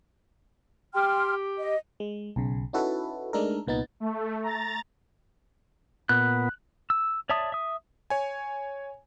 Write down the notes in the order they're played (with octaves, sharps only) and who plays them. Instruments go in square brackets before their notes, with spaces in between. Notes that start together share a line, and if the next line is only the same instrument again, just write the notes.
[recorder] G4 [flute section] G5 C6 F6
[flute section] D#5
[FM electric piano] G#3
B1 C#3
C#4 D#4 E4 F#4 A4 B4
G#3 A3 D4 D#4 A4 A#4
C2 A#2 B3 D#4 A6
[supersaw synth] A3
A#5 A6
[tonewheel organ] A#2 B3 [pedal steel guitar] F#6
[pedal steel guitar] E6
C#5 D5 E5 A5 D#6
E5 D#6
[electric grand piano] C#5 G#5